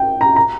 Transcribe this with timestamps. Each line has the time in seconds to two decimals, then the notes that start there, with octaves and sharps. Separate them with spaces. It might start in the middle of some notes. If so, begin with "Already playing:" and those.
Already playing: G5
0.21 A#5
0.36 A#5